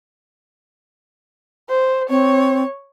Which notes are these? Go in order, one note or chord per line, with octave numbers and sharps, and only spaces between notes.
C5
C4 C#5